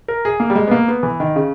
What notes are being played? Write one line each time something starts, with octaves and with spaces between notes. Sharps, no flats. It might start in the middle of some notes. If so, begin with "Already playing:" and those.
A#4
G#4
A#3
G3
G#3
B3
A#3
B3
E3
D#3
C#3